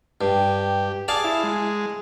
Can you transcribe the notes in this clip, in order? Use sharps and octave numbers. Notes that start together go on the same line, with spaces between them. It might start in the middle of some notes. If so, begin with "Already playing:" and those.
G2 G4
G#4 D5 F5 A5
E4
G#3